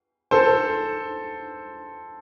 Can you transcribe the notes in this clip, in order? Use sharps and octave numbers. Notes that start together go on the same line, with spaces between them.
A4 C5